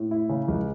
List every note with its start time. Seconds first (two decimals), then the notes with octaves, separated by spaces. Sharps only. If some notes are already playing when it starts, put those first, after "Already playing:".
Already playing: A2
0.11 E4
0.29 C#3
0.48 C#2